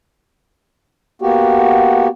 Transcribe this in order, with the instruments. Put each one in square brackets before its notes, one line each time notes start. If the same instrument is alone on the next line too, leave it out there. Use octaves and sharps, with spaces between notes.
[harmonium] A#3 B3 F#4 G4